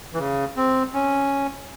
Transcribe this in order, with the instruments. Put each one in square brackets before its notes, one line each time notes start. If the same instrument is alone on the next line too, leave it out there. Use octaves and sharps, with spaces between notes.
[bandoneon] E3
C#3
C4
C#4